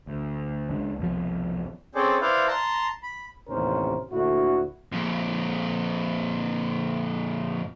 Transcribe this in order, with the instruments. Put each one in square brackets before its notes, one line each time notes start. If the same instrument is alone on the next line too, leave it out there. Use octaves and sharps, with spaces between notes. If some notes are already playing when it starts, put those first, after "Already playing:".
[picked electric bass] D2
C#2 G#3 D4
C2 F2 B2 F3
[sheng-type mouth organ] C4 C#4 G#4 A4 C5 D5
E4 B4 C5 D5 E5 F5
A5 A#5 C6
B5
[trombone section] A1 D#2 C3 C#4 A#4 C5
D2 A#2 D3 E4 F#4
[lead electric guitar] F2 A#2